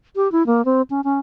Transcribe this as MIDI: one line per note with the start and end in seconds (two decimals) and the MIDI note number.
0.16 0.31 67
0.32 0.46 64
0.47 0.64 58
0.65 0.82 60
0.90 1.01 61
1.04 1.19 61